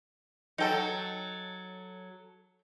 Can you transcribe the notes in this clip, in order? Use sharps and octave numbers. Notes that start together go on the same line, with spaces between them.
F#3 D#4 A4 G5 A#5